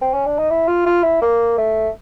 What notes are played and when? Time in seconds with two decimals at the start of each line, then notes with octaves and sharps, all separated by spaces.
0.02 C4
0.14 C#4
0.26 D4
0.39 D#4
0.50 E4
0.68 F4
0.86 F4
1.03 E4
1.22 A#3
1.58 A3